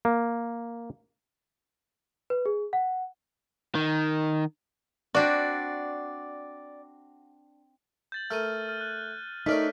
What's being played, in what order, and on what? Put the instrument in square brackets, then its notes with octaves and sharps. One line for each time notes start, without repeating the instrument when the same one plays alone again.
[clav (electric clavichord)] A#3
[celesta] B4
G#4
F#5
[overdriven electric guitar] D#3
[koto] C4 D4 F#4 [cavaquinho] D5
[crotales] G6 A6 F#7
[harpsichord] A3 A#4 [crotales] F6 D#7
[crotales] F6
F#6
[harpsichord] A3 C#4 A#4 [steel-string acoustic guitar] D#4 D5 [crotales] B6